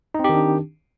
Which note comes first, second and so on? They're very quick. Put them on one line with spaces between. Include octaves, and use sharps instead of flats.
D#4 C4 G4 D#3 D4